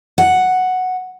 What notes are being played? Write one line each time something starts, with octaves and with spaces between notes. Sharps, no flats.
F#5